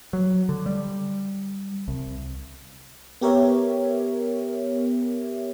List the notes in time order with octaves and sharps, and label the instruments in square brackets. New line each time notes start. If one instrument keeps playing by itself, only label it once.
[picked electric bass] F#3
D3
G3
C2
[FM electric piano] B3 G4 A#4 C#5 E5